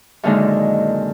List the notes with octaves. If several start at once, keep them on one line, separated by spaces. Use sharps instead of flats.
F#2 A#2 D3 D#3 G#3 D#4